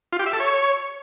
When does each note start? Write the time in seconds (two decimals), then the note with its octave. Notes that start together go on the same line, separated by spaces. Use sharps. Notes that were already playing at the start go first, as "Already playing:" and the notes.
0.13 F4
0.19 G4
0.26 E5
0.33 A4
0.40 C#5